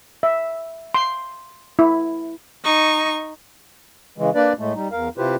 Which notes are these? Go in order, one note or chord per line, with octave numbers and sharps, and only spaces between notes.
E5
C6
E4
D#4 C#6
C#3 E3 G#3
A#3 D4 B4 D5
A2 G#3 A3
G3 D#4
E2 A#4 F5
C3 E4 F4 G4 B4 C5